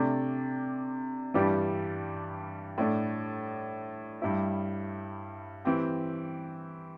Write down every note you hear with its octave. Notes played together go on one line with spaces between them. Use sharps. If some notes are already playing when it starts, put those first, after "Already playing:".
Already playing: C3 A3 D4
G2 E3 G3 D4 G4
A2 A3 D4
G2 G3 E4
E3 C4 G4